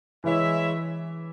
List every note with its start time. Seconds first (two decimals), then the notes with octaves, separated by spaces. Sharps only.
0.24 E3 G#3 E4 C#5 E5